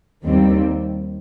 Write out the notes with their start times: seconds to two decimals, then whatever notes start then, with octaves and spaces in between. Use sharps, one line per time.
0.24 D#2 D#3 G3 C4